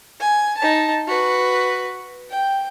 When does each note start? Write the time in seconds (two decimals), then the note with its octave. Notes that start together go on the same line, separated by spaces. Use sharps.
0.20 G#5
0.57 D#4 A5
1.07 F#4 B4
2.30 G5